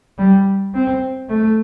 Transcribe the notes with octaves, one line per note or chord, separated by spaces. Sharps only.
G3
C4
A3